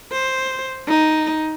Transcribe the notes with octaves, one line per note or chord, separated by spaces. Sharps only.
C5
D#4